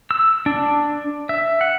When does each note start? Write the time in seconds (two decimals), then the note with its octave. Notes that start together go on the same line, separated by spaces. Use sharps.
0.11 E6
0.46 D4
1.29 E5
1.61 F#5